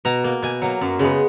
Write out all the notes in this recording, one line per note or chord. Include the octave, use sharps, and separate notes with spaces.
B2 A#5
A#3
B2 G#5
F#3 A#3
F#2
C#3 G#3 B3